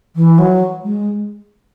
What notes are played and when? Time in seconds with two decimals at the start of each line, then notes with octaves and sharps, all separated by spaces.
0.16 E3
0.38 F#3
0.83 G#3